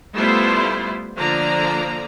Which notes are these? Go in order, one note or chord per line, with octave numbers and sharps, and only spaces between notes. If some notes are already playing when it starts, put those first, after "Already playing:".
G3 A3 B3 E4 F4 C5
D3 F3 A#3 D5 A#5